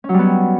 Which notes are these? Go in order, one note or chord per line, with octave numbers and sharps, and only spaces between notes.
F#3 G3 B3 C#4